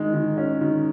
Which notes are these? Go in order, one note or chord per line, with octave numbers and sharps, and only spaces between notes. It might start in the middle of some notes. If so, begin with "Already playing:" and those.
Already playing: D#3 G#3
D#3
C#4
D#3